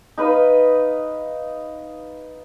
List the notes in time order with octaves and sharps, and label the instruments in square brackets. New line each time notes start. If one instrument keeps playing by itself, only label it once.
[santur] D#4 B4 D#5 F5